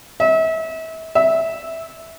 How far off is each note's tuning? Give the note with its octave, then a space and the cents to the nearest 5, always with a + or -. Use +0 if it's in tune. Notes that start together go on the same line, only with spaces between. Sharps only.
E5 -35
E5 -10